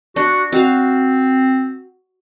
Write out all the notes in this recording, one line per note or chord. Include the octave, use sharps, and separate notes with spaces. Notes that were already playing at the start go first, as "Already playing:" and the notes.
D4 F#4
C4 F#4 F5